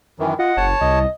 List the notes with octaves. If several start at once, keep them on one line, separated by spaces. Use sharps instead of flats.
F#2 D#3 E3
F4 D#5 F#5
F#1 C#5 A5
C2 D#5